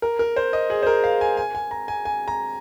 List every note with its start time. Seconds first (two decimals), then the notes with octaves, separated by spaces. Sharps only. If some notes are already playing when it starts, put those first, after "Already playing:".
0.02 A#4
0.19 A#4
0.36 C5
0.53 D#5
0.70 G#4
0.83 C5
0.87 A#4
1.04 F5
1.21 G#5
1.37 G#5
1.55 G#5
1.71 A#5
1.88 G#5
2.05 G#5
2.28 A#5